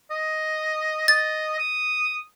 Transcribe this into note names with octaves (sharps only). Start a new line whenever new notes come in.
D#5
D#5 A6
D#6